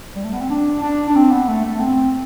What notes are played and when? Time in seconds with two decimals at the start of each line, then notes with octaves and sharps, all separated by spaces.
0.16 G3
0.24 A3
0.33 B3
0.41 C4
0.50 D4
0.82 D4
1.09 D4
1.16 C4
1.32 B3
1.48 A3
1.65 A3
1.80 C4